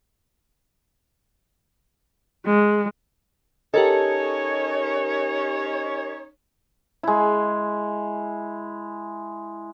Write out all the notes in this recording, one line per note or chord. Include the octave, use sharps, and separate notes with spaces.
G#3
C#4 D#4 G4 A4 A#4 C#5 D#5
G#3 E4